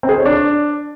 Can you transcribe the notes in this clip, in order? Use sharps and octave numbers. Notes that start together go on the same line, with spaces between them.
C4
G#4
C5
C#5
D4